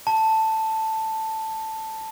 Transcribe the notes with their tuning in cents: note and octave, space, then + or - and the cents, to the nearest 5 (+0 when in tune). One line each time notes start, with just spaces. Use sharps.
A5 +5